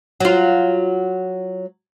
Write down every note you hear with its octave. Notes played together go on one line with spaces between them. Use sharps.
F#3 F4